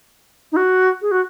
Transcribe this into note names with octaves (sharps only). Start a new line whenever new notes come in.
D#4
F#4
G#4
F#4